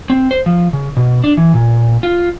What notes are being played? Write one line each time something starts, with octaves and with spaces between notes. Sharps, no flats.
C4
C5
F3
C#3
B2
D4
E3
A#2
F4